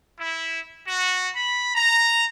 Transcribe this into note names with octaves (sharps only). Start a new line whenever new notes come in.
E4
F#4
B5
A#5